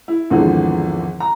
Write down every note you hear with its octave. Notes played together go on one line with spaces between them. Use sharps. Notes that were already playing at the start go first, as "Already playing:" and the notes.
E4
G#1 E2 D3 E3 F3
A#5